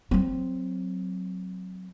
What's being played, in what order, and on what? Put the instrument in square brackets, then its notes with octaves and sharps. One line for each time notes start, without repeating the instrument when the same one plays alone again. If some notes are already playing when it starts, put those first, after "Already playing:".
[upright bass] F#3 C4